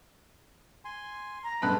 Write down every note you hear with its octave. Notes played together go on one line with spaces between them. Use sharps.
G#5 C6
A#5
G2 G#3 A3 B3 A5 B5 F#6